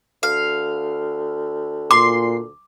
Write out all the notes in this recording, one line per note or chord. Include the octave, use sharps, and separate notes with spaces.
D2 F5
A#2 C6 D6